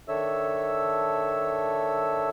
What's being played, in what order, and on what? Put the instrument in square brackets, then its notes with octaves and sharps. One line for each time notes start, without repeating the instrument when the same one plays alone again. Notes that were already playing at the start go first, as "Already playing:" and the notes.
[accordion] D#3 D4 A4 C#5 E5 E6